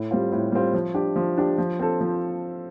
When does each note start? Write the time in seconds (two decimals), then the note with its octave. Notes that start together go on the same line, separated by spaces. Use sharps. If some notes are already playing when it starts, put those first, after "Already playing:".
Already playing: A2
0.11 G3 C4 F4
0.32 A2
0.52 G3 C4 F4
0.74 F3
0.94 D4 G4
1.16 F3
1.37 D4 G4
1.58 F3
1.79 C4 F4 A4
2.01 F3